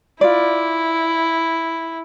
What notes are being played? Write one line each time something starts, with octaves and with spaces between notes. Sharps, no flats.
E4 F4 D5